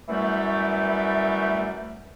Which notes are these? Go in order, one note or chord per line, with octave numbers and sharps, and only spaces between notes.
F#2 E3 G3 A3